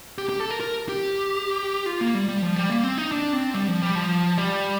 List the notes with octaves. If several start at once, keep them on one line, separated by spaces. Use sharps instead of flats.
G4
G4
A4
A#4
A#4
G4
F4
A#3
G3
G3
F3
G3
A#3
C4
D#4
D4
C4
G3
F3
G3
F3
G3